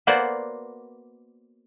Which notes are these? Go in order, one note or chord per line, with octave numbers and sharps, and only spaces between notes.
A#3 B3 F#4 C5 D5